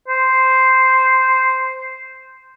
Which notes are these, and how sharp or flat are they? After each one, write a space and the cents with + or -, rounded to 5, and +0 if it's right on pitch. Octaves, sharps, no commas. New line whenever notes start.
C5 -5